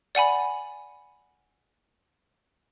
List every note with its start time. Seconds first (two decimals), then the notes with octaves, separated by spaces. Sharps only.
0.15 D5 F#5 G#5 B5